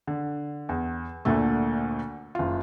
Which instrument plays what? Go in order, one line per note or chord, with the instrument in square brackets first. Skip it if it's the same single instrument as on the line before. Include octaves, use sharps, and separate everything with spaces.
[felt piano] D3
E2
D2 A#2 D3 A3
F#1 F4